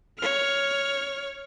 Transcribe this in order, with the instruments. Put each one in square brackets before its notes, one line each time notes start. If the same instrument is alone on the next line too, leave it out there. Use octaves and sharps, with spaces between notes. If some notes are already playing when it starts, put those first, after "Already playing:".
[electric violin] C#5 F6